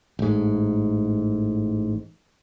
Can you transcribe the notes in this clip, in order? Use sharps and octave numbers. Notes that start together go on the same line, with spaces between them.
A1 G#2